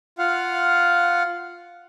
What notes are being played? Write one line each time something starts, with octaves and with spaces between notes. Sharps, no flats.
F4 F5 F#5